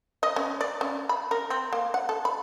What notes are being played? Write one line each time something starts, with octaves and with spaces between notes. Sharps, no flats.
D#5
C#4
D5
C#4
B5
A#4
C4
A#3
F#5
A4
B5